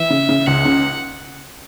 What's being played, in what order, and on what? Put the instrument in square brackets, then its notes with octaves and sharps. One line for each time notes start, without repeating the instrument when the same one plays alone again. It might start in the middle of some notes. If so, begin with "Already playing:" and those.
Already playing: [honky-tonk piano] E3 [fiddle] E5
[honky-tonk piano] C#3
C#3
[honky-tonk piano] C#2 [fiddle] F#5
[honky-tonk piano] C#3